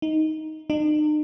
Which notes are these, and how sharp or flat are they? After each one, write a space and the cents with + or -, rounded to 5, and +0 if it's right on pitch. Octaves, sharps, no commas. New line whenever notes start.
D#4 +10
D#4 -45